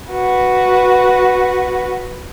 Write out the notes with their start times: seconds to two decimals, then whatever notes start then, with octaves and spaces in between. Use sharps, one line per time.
0.11 F#4 B4